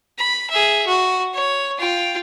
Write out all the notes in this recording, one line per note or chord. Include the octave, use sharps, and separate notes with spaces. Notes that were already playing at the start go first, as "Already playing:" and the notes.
B5
G#4 E5
F#4
C#5
F4 G5